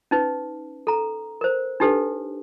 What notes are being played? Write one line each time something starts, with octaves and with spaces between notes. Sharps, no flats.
C#4 D#4 B4
A4 A#5
A#4 C5
D4 D#4 G4 A4 B4